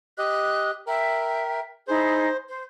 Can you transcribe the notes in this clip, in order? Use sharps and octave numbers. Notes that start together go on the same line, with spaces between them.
G4 D#5 F#6
A#4 E5 G5
D#4 E4 G#4 C5
C5